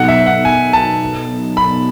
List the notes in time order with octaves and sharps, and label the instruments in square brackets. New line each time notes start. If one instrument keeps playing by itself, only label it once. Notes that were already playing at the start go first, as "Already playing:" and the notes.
Already playing: [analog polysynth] B2 F#3 B3 D#4 A4 [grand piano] F#5
[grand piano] E5
F#5
G#5
A5
B5